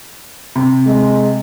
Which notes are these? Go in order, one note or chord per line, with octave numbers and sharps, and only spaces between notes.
C3
G#3